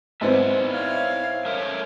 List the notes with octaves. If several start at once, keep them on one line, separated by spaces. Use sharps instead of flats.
G#2 B3 C4 E4 D5 E5
C#5 F5
A3 A#4 C#5 E5